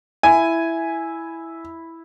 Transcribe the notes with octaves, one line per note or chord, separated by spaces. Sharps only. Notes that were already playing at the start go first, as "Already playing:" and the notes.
E4 G#5